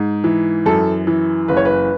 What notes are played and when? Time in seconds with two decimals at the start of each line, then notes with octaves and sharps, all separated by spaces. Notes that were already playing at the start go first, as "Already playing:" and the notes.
Already playing: G#2
0.24 E3
0.66 F#2 A4
1.07 E3
1.48 F#1 B4
1.57 C#5
1.65 B4